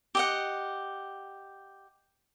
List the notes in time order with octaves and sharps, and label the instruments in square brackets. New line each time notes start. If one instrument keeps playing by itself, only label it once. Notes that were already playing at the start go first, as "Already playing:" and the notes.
[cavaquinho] G4 D#5 F#5